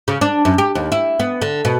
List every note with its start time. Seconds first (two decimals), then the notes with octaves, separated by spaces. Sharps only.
0.08 C#3
0.21 D4
0.45 F#2
0.58 G4
0.75 D#2
0.92 E4
1.20 B3
1.42 D3
1.65 B2